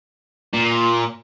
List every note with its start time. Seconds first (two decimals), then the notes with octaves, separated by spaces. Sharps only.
0.54 A#2